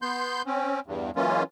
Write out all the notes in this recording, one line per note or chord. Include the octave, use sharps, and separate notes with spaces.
B3 C6 G6
C4 C#4
E2 G2
E3 F#3 G#3 A#3 C#4 F4